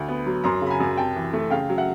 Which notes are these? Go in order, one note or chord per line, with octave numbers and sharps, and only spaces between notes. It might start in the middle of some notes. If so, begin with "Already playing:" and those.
Already playing: D2
B3
F#3
F#2 A#5 C6
C#3 B5
G#5 A#5
F#2
C3 G5 A5
E3
A3
C#3 F5 G5
F#3
E5 F#5